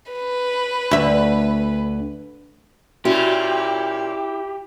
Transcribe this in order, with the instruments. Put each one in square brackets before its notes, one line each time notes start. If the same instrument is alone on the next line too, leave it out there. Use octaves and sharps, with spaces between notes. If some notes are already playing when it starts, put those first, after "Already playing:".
[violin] B4
[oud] D2 E5
[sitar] A#2 A#3 C#4 [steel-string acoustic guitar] E4 [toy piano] F#4 [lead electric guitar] G4